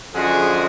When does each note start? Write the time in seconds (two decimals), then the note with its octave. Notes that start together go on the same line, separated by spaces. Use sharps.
0.14 F#2 D3 F3 G#3 F#4 G#4